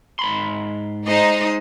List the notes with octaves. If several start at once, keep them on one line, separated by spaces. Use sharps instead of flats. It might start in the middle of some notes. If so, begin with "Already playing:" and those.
G#2 B5 C6
G#3 D#4 C5 D#5